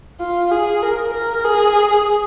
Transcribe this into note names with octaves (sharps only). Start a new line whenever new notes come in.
F4
G#4
A#4
A#4
G#4